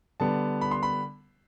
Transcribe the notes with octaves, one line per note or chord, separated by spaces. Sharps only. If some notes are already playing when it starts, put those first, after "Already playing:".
D3 G3 B3 A5
B5
C6
B5